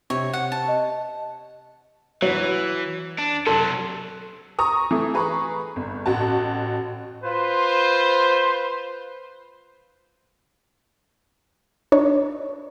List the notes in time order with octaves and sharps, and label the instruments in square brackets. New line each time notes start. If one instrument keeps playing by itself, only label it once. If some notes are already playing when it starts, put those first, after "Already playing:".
[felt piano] C3 [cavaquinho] C#5
[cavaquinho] F#5
A5
[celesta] D#5
[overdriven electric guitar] E3 [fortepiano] F#3
[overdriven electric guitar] D4
[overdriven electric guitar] C3 F#3 [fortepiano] A4
[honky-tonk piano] A#5 C#6 D#6
E3 A3
G#4 B4 A#5 C#6
G1
A1 F#4 A5
[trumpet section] F4 B4 C5
[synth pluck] D4 D#4 C#5